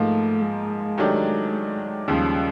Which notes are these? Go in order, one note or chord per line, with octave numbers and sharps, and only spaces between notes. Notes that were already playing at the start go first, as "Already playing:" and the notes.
Already playing: G#2 F3 A3 A#3
G#3
D#3 F#3 A3 D4 G4
D#2 C#3 F3 G3